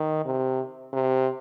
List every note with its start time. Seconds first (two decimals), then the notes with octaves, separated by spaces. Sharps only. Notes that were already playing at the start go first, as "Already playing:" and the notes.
Already playing: D#3
0.25 C3
0.93 C3